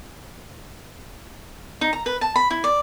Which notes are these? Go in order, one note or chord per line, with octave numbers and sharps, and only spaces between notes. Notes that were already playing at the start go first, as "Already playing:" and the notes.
D#4
A#5
B4
A5
B5
E4
D5